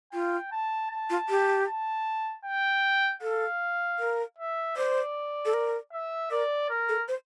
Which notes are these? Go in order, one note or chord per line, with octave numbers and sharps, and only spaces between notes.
F4 G5
A5
A5
F4
G4
A5
G5
A4 F5
A#4
E5
C5 D5
A4
A#4
E5
A#4 D5
A#4
A4
C5